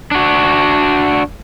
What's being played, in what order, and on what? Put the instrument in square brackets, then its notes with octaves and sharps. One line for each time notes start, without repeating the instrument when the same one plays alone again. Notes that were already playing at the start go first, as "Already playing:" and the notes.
[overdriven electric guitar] D4 F#4